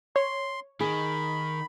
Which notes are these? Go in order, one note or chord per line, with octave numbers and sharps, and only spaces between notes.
C#5 C6
D#3 G#4 B5